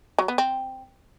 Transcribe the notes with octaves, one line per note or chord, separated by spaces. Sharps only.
F#3
B3
C4